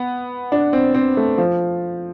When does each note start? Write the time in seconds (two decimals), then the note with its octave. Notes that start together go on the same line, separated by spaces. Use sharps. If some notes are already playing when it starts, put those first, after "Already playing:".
Already playing: B3
0.52 D4
0.73 C4
0.94 C4
1.17 A3
1.38 F3